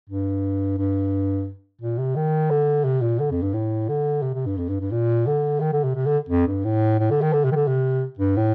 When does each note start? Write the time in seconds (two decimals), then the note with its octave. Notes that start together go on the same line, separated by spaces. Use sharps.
0.10 G2
0.78 G2
1.81 A#2
1.98 C3
2.16 D#3
2.51 D3
2.84 C3
3.01 A#2
3.19 D3
3.31 F2
3.42 G2
3.53 A2
3.89 D3
4.22 C3
4.34 C3
4.46 G2
4.58 F2
4.69 G2
4.81 G2
4.92 A#2
5.27 D3
5.60 D#3
5.73 D3
5.84 C3
5.95 C3
6.06 D3
6.29 F2
6.47 G2
6.64 A2
6.99 A2
7.11 D3
7.21 D#3
7.33 D3
7.44 C3
7.52 D#3
7.55 D3
7.67 C3
8.19 G2
8.37 A2